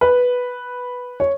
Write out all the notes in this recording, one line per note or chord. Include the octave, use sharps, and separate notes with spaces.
B4
C#5